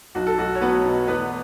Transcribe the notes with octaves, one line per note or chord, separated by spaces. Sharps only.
B1 F#4
A4
B1 F#4
C#5
F#3 B3 B4
B2
E2 B3 B4